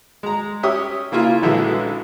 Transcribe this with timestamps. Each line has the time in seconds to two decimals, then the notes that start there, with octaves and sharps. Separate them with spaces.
0.23 G#3 A#5
0.63 C#4 G4 E5 D#6
1.12 C#3 A#3 E4 F4 F6
1.42 A#1 D3 E3 F#3 G#3 E5